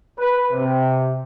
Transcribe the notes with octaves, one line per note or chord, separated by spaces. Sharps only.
B4
C3